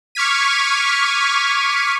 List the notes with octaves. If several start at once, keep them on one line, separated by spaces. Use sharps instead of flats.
C#6 D6 F6 G#6 B6 D#7